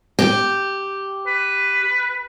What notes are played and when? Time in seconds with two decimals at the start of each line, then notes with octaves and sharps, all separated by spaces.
0.19 G4
1.27 B4